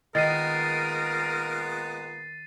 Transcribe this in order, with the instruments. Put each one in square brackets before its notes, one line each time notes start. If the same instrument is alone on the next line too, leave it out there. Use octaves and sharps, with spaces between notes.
[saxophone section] A#2 G#3 B3 [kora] D#3 [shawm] A#4 [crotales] A6 C7 D#7